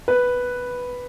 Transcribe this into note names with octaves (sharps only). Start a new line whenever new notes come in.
B4